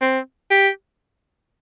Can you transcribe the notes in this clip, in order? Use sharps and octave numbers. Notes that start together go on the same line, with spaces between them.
C4
G4